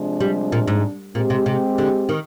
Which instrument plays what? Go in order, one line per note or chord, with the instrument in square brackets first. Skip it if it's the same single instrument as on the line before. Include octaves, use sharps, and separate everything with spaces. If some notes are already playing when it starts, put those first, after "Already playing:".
Already playing: [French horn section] C3 F3 G#3 D4
[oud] G3
A#2
G#2
[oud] A#2 [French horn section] G#3 C4 G4
[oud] C3
C3
D3
D#3